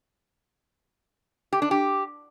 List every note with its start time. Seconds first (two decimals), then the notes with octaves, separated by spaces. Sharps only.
1.53 G4
1.62 D4
1.71 G4